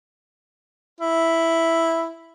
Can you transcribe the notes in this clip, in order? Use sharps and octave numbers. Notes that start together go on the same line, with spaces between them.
E4